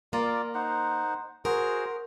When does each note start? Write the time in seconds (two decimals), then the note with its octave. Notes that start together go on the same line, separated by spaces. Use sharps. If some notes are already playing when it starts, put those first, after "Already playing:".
0.13 A#3 F4 A#4 D5
0.55 D#4 C5 F#5
1.45 F#4 G#4 A#4 C5